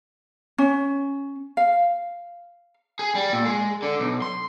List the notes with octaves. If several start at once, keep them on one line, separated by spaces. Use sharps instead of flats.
C#4
F5
G#4
G3
A#2
G#3
D3
B1
C6